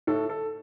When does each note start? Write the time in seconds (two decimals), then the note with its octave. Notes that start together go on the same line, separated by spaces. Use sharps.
0.07 A2 A4
0.29 A4